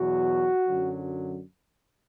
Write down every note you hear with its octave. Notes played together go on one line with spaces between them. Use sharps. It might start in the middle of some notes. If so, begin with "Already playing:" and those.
Already playing: E2 B2 F#3 F#4
F#2 D3 F#3